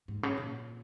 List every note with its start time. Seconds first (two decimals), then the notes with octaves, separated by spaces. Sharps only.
0.08 G#2
0.23 C#3
0.37 A#2